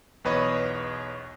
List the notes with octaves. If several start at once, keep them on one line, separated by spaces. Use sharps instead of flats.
B1 E2 B4 C#5 D#5